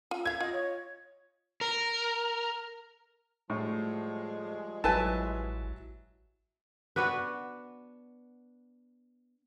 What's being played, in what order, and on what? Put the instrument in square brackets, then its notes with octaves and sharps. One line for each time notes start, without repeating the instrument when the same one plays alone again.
[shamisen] F4
[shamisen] E5 F5 [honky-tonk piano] G#6
[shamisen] F4 [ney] D#5
[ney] C#5
[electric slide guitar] A#4
[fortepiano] A2 [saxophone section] F3 G3 G#3
[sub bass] A1 [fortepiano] F#3 E5 A5 [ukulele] E4 B4 G#5
[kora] B3 D4 F#4 B4